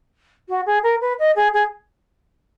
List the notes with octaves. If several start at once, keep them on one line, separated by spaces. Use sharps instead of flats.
F#4
G#4
A#4
B4
D#5
G#4
G#4